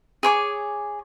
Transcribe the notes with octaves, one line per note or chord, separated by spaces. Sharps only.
G#4 C#5 D6